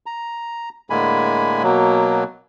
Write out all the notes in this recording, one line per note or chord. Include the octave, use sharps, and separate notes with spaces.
A#5
A2 D3 G#3 A#3 G#5 B5
B2 F#3 A#3